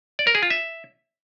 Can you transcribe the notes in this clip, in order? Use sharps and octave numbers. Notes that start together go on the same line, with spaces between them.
D5
A#4
G#4
F4
E5